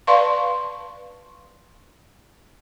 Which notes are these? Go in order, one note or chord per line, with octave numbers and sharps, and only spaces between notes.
B4 D5 F5 A5 C6 C#6